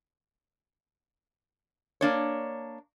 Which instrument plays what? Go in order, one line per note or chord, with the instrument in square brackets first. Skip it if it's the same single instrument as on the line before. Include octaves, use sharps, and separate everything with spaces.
[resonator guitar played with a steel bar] A#3 D4 C#5